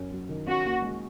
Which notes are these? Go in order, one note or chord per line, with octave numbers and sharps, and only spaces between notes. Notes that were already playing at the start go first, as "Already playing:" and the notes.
Already playing: F#2 C#4
F#3
D#3
C#4 F#4
D#2
G#3